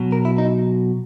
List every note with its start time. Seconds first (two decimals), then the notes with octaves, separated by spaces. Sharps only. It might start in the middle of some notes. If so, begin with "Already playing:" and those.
Already playing: B2 F#3
0.12 A#4
0.25 E4
0.38 D#4